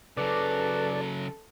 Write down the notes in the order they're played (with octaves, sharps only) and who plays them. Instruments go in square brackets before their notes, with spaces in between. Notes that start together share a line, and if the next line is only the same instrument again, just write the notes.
[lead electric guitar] C#3 F#3 [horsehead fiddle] A4 [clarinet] B4 [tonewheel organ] D5